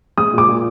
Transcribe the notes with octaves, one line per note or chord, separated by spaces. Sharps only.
G#3 D#6
A#2 D6
A#2